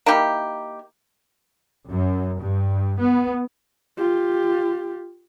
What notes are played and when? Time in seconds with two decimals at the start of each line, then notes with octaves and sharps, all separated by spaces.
0.06 A#3 D#4 E4 G4
1.88 F#2
2.40 G2
2.99 B3
3.97 F4 G4